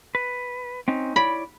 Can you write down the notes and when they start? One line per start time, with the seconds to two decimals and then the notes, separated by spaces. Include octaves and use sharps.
0.15 B4
0.88 C4 C#4 D#4
1.16 E4 C#5 D5 B5